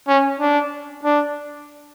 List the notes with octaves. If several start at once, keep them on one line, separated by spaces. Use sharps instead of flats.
C#4
D4
D4